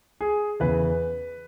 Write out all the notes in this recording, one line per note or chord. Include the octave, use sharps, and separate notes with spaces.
G#4
E2 C#3 E3 B4